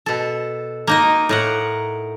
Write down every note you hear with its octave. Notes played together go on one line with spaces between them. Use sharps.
B2 A4
A#3 D#4 D#5
A2 A#4 F#5